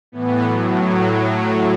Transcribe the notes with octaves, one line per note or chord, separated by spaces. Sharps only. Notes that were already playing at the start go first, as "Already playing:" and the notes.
A2 E3 B3
A2 F#3